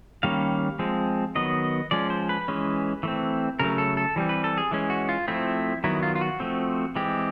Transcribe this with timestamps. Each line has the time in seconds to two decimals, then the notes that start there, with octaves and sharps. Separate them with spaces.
0.23 D#3 G3 A#3 C#4 F5
0.79 F3 G#3 C4
1.35 D#3 F#3 B3 D#5
1.91 F3 G#3 C#4 D5
2.10 C5
2.29 B4
2.48 E3 G#3 C#4
3.03 E3 A3 C4
3.59 C#3 F#3 A3 A#4
3.78 A4
3.97 A4
4.16 E3 G3 C4
4.29 B4
4.44 A4
4.58 G#4
4.71 E3 G#3 C#4
4.90 F#4
5.09 F4
5.28 F3 A3 C4 E4
5.84 D#3 F#3 B3 E4
6.03 F4
6.16 F4
6.21 F#4
6.40 F3 A3 C4
6.96 E3 G#3 C4 G4